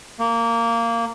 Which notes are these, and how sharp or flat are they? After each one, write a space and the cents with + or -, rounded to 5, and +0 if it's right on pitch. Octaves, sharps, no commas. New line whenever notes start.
A#3 -15